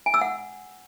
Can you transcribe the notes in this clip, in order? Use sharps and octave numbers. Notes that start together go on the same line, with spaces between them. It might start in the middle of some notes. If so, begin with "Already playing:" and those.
G#5
E6
F#5